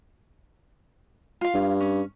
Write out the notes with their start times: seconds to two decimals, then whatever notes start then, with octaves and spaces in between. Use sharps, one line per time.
1.41 F4 F5
1.54 G2
1.80 C#4